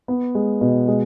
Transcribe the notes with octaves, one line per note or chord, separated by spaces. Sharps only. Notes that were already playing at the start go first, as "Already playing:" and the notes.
B3
G#3
B2
G#3